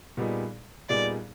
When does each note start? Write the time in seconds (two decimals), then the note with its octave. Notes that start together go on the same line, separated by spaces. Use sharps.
0.17 A#2 G3 B3 D#4 G#4
0.89 A#2 G3 B3 D#4 G#4 D5